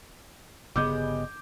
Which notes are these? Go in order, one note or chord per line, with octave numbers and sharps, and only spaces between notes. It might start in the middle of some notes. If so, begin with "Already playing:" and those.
G1 C#3 G3 G#3 B3 D#5 D6 G6